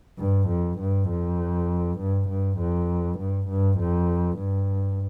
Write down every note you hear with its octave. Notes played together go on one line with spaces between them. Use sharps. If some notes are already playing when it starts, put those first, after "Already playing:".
G2
F2
G2
F2
G2
G2
F2
G2
G2
F2
G2